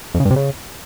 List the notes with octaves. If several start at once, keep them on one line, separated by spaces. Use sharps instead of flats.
F2
C#3
G2
C3
C#3